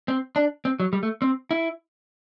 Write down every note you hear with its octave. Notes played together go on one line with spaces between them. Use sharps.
C4
D4
C4
F#3
G3
A3
C4
E4